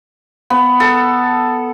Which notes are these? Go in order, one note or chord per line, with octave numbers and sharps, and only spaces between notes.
B3
A4